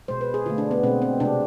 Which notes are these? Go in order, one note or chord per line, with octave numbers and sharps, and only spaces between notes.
B2 G#3 C5
B4
G#4
D3 A3 F4
D4
B3
B2 G#3 C4
C4
C3 G#3 D4